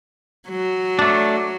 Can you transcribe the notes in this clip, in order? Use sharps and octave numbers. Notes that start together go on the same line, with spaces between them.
F#3
A3 D4